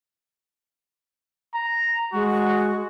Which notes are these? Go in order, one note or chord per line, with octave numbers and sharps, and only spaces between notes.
A#5
G#3 F#4